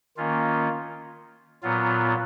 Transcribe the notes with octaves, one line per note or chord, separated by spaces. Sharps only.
D#3 A#3 C#4 F4
A#2 F#3 B3 F4